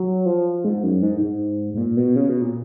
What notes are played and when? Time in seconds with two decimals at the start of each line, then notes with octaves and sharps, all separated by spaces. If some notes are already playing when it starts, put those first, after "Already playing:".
Already playing: F#3
0.26 F3
0.65 G#2
0.83 F#2
1.02 G#2
1.21 G#2
1.74 G#2
1.78 A#2
1.97 B2
2.16 C#3
2.29 B2
2.42 A#2